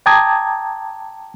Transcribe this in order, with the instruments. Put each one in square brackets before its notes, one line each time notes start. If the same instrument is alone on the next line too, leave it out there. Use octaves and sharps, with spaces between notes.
[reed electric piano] G5 A5 A#5 D6 D#6 G#6